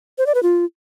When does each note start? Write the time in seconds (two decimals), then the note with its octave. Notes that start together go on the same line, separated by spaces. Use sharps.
0.18 C5
0.26 D5
0.35 B4
0.43 F4